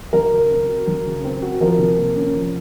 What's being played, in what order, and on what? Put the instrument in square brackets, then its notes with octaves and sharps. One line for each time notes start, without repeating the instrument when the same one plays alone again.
[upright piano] F#3 [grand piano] A#4
[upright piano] C#3
C4
F#4
F#3
C#3
C4
F#4
[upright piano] F3 [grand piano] A#4
[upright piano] C3
A#3
C#4
F3